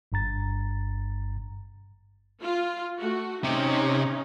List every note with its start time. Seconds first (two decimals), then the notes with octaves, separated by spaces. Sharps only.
0.12 G1 G2 A#5 A6
2.42 F4
2.99 A3 F#4
3.44 C3 C#4 D#4